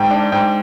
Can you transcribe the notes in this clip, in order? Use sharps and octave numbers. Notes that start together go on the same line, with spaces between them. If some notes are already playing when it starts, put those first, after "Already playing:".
Already playing: G#2 G5
D4
G#2 G5